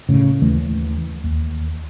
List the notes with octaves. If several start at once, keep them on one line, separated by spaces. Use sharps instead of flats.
G1 A2 C#3
D#2 E3 A3
D#2